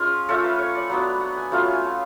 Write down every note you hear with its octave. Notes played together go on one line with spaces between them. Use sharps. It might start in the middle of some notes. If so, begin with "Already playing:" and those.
Already playing: G#3 C#4 F4
A3 C#4 F4 A4
B4
C#5
D5
F#3 B3 D4
F#5
G#5
F#3 A3 C#4 F4 A5
G#5
A5